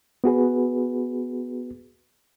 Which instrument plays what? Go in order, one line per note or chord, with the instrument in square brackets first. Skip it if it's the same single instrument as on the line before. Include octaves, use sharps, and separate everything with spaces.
[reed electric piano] B3 F#4 G#4 B4